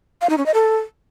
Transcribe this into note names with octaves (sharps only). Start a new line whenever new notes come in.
F5
D#4
C#4
D#5
A4